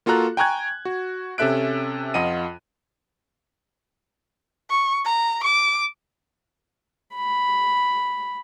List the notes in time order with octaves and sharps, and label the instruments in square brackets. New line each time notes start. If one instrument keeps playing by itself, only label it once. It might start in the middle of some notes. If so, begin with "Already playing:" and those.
[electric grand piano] A#3 F4 F#4 A4 A#5 F#6
G5 G#5 A#5 C#6 F#6 G#6
F#4
C3 C#4 A4 E5 F#6 D7
F2 F4 D#5 F#5 D#7
[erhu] C#6
A#5
D6
[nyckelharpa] B5